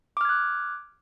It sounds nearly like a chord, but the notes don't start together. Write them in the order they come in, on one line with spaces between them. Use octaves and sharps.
D6 F6 G#6 F#6